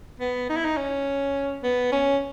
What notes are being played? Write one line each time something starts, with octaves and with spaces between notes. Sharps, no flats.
B3
D#4
E4
D#4
C#4
B3
C#4